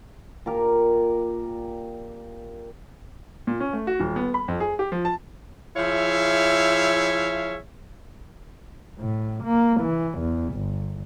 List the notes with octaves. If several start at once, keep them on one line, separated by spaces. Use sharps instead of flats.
A#2 G4 A#4
A#2
C#4
A3
F#4
D#1
B3
B5
F2
G#4
G4
F3
A5
F3 E4 G#4 C#5 E5 F5
A2
A#3
E3
E2
G1